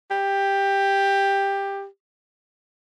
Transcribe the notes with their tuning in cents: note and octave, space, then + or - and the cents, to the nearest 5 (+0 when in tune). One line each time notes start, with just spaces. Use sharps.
G4 +10